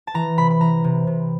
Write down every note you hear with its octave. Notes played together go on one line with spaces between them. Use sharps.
A5
E3 A#5
C3 B5
B5
E3 A#5
C3
C3